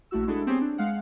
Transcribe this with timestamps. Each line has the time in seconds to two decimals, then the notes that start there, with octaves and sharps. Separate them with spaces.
0.11 A#1 A3 E4 F#4 E6
0.27 G#3 D4 E4 F#4 G#4 A4
0.46 B3 C4 G4 G#4 C5 C#5
0.61 D4
0.78 G#3 F5 F#5